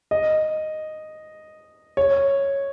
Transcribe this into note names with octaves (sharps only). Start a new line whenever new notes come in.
D#5
C#5